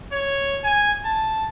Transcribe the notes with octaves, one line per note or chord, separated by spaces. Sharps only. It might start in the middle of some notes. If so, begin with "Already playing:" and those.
C#5
G#5
A5